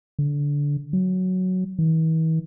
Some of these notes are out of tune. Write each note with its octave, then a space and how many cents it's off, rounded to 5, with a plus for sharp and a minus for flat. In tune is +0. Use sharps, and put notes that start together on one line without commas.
D3 -20
F#3 +0
E3 -45